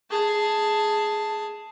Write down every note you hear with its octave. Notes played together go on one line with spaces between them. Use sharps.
G#4 A5